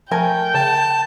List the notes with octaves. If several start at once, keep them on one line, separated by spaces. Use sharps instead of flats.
F3 A3 A#4 G5 G#5
C#3 A5